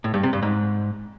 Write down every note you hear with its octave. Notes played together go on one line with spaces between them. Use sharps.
A2
G2
C3
G2
G#2